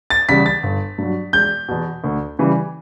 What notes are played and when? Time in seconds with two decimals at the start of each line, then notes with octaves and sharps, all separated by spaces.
0.10 A6
0.28 E2 C#3 G3 B6
0.46 A6
0.63 G1
0.98 G2 F#3
1.33 E1 G6
1.68 E2 B2
2.04 D2
2.39 C#3 E3 G3